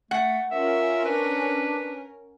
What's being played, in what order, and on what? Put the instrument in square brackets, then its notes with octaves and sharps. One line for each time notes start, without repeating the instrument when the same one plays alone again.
[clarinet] A3 [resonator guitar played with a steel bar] F#5
[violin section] C#4 A#4 [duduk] F4 [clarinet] E5
[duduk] D4 [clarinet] B4